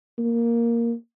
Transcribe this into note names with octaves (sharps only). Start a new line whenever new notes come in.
A#3